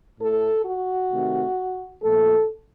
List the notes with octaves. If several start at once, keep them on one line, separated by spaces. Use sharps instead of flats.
A2 A3 A4
F#4
C3 D#3 A3
A#2 F3 A3 A4